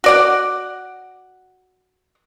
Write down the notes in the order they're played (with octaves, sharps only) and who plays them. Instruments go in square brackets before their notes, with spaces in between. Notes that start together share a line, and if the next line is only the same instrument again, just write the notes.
[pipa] F#4 D5 F#5